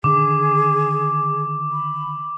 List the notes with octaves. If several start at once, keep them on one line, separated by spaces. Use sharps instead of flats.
D3 D#3 D4 G#4 D6
B5